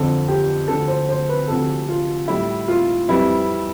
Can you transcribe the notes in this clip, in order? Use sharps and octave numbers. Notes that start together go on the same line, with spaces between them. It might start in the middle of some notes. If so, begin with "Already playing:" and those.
Already playing: F2 D3 F3 A4
G4
D2 D3 F3 A4
C5
C5
B4
D2 C3 F3 A4
F4
A2 G3 E4
F4
F2 E3 G3 E4